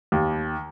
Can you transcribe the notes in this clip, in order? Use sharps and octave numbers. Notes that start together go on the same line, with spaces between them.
D#2